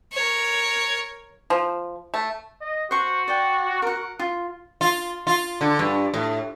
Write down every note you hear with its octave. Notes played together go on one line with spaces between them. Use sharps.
A#4 C#5
F3
A3
D#5
F#4 C5 C#6
D5 G5
A#4 F#5
F4
F4
F4
D3
G2
A2